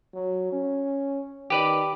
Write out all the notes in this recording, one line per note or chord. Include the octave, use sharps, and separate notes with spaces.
F#3
C#4
D#3 G4 B4 D5